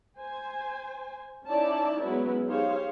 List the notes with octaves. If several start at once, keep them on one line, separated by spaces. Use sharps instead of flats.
C5 G#5
C#4 D#4 E4 D5 A5
F#3 G#3 B3 C#4 E4 B4
D#4 G4 G#4 C5 C#5 F5